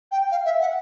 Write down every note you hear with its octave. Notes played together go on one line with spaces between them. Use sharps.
G5
F5
E5
F#5